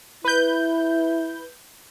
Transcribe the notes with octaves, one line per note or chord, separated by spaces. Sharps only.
E4 B4 G6